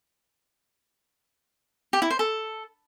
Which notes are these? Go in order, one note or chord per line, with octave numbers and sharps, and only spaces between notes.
G4
E4
C5
A4